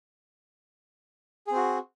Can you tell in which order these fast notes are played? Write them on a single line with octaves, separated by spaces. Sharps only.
G#4 C4 F#4